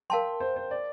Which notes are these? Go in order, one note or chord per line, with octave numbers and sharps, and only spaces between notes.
A#4 F5 G5 A5 C6
C5
C5
D5